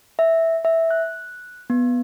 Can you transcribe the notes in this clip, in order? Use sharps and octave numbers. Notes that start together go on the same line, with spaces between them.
E5
E5
F#6
B3